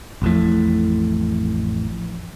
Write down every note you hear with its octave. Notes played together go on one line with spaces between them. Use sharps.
A1 F2 A2